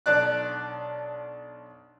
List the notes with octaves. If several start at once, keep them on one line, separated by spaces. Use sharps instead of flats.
B1 D4 D5 F#6